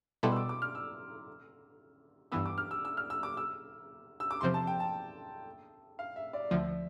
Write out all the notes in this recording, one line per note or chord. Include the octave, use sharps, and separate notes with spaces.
B2 G3 B3 E4 A4 C6
E6
D6
D6
F6
E6
G2 E3 B3 E6
D6
F6
E6
E6
F6
E6
D6
E6
E6
D6
E2 C3 F3 C4 C6
A5
G5
A5
F5
E5
D5
D2 D3 F3 E5